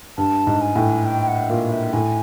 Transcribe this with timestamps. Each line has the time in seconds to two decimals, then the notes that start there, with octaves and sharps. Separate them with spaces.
0.18 G2 A5
0.47 G#2
0.61 G#5
0.76 A2
1.06 G5
1.28 F#5
1.49 A#2 F5
1.71 E5
1.93 A2 G#5